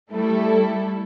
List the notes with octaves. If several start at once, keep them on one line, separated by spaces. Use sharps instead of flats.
G3 A3 E4 A4